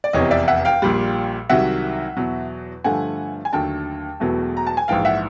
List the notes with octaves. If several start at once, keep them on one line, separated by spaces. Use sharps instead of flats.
D5
F1 E2 C3 C#5 D#5
D5 E5
E5 F#5
F5 G5
A#1 A#2 G3
C2 C3 D#3 F#3 E5 F#5
E2 B2 F#3
G2 D3 F3 A3 F#5 G#5
G#5
D#2 D3 F#3 A3 G5 A5
E1 E2 B2 F#3 A3
A#5
A5
G#5
A#1 G#2 E3 F5 G5
E5 F#5